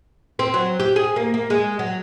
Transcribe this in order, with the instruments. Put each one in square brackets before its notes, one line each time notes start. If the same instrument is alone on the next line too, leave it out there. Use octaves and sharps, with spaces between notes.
[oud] C4
F#3
G4
G#4
A#3
A#3
G#3
F#3